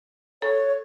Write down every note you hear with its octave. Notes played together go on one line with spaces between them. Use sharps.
A4 C#5